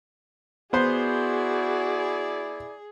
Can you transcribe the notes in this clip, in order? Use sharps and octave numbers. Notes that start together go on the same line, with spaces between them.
B3 E4 F#4 G#4 C5 D5